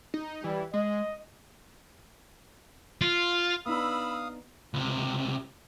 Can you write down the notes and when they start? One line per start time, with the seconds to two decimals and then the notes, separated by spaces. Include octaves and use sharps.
0.14 D#4
0.44 E3 G3
0.74 G#3 D#5
3.01 F4
3.66 B3 D4 D#4 F5 B5 D#6 E6
4.74 C#2 C3